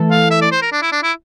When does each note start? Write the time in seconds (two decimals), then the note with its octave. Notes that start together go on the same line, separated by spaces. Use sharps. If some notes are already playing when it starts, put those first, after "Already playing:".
Already playing: E3 A3 E4 A4
0.11 F5
0.31 E5
0.42 D5
0.52 C5
0.62 A#4
0.72 D4
0.82 E4
0.92 D4
1.03 E4